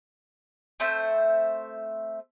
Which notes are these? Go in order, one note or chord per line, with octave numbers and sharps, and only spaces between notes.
A3 C4 C5 E5